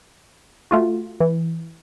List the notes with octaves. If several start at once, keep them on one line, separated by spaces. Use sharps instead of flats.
A3 F4 F#4
E3